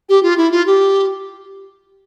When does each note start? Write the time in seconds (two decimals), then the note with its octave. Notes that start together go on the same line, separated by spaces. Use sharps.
0.09 G4
0.23 F4
0.37 E4
0.51 F4
0.66 G4